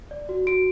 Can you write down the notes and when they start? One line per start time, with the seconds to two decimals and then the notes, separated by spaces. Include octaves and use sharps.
0.11 D5
0.29 F#4
0.47 F#4 D7